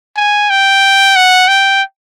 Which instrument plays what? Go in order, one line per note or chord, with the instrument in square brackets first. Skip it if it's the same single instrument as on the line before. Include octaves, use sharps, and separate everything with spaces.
[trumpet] G#5
G5
F#5
G5